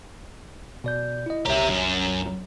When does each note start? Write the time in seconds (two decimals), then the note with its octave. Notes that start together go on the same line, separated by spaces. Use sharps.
0.84 B2 D5 G6
1.26 E4 D#5
1.45 C2 G4 C#5 E5 A#5
1.69 F#2